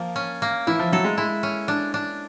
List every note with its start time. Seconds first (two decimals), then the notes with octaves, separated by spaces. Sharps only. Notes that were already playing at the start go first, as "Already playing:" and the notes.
Already playing: F3 A#3
0.16 C#4
0.42 A#3
0.67 E3 E4
0.79 F3
0.92 F#3 A4
1.04 G#3
1.18 G#3 E4
1.43 C#4
1.68 D4
1.94 D4